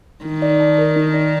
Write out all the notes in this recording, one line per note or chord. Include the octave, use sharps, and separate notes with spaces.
D#3 D#4
D5
A5
A#4
D#4
D5